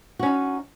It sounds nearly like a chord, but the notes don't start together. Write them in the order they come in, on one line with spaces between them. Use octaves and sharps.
F#4 C#4 D#4